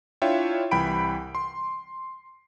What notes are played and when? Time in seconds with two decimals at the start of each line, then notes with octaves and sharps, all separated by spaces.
0.22 D4 E4 F4 C#5 E5 G5
0.71 C2 E3 G5 B5 D7
1.35 C6